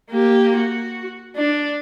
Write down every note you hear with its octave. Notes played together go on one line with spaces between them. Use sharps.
A#3 G4
F#4
D4